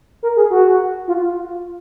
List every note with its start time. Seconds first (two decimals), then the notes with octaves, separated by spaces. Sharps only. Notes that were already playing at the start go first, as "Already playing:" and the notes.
0.23 A#4
0.36 G#4
0.50 F#4
1.08 F4